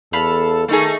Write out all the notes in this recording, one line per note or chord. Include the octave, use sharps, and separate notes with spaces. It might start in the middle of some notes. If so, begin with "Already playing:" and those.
E2 A4 F5 B5
D#3 A3 D#4 G#4